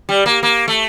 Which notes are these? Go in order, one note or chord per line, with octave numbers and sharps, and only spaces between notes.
G3
A#3
A#3
A3